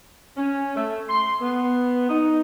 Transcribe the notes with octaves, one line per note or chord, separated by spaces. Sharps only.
C#4
A3
C6
B3
D#4